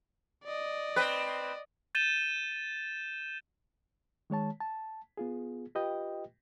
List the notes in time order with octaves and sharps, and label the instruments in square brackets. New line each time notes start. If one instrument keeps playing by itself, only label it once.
[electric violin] D5 D#5
[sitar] C4 B4
[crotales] G6 A6 D#7 E7 G7
[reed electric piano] D#3 G#3 C#5 A5
A5
B3 F4 G#4
F4 G4 B4 D#5 G5